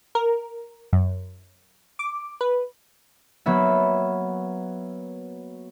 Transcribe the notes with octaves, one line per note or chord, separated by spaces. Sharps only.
A#4
F#2
D6
B4
F#3 A#3 B3 E5